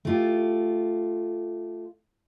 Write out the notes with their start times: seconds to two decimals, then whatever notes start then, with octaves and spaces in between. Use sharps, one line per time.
0.05 A3 F4 G4